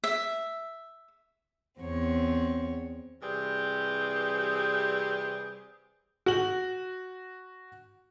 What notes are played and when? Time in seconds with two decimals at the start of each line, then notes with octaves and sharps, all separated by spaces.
0.04 E5
1.81 E2 C4 C#5
3.22 C3 E3 G3 C4 G4 G#4
6.26 F#4 F#7